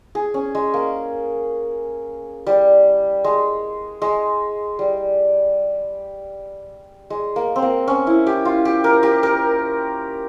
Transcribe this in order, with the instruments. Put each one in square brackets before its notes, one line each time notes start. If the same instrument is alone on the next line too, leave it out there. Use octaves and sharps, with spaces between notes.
[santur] G#4
C#4
G#3
A#3
G3
G#3
G#3
G3
G#3
A#3
C4
A#3
C#4
E4
G4
F4
G4
A#4
G4
A#4